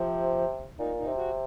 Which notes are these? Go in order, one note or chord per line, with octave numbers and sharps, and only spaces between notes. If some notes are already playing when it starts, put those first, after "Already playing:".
Already playing: C3 F3
A#2 D#4
D#4
C3
F#4